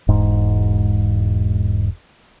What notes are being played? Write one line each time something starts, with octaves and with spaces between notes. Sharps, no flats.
E1 G#2